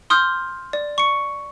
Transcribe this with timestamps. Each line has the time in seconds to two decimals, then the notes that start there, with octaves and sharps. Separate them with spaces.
0.10 C6 D#6 F6 G6
0.73 D5
0.98 C#6 C#7